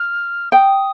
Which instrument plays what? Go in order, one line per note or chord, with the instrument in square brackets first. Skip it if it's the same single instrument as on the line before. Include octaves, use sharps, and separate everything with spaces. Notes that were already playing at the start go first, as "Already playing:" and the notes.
Already playing: [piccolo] F6
[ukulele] G5 [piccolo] D#6